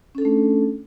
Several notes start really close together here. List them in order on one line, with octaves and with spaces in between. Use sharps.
C#4 A4 D4 A3